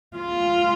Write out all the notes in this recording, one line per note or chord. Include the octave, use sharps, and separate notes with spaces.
F4